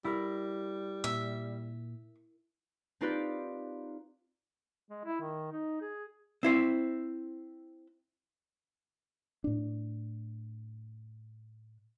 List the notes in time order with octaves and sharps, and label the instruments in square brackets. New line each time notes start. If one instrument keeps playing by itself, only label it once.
[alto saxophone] G3 [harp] E4 A#4
[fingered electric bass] A#2 [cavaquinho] E5
[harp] C4 D#4 F4 G4 B4 D5
[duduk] G#3
E4
D#3
D#4
G#4
[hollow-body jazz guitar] C4 E4 C5
[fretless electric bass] A2 D4